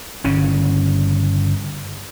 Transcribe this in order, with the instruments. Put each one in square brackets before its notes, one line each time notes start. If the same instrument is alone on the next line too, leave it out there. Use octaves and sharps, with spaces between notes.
[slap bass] G1 C#3 C#4